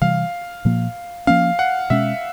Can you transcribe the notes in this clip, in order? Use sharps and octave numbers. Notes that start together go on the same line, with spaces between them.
C3 E3 G3 F5
A#2 F3 A#3
F3 A#3 C#4 F5
F#5
B2 G#3 C#4 E5